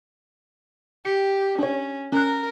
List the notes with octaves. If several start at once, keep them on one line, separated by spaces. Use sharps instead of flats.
G4 C#7
C#4 D4 C#5
C#4 A#4 F#6